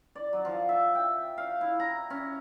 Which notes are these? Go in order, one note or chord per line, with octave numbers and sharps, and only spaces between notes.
D5
F#3
F3
E5
G5
F5
E4
A#5
C#4